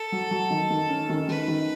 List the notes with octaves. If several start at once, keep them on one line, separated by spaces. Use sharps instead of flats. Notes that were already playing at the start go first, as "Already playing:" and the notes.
Already playing: A4
F#3
F#3
D#3
D#3
C#4
D#3
D#3 B4
D#3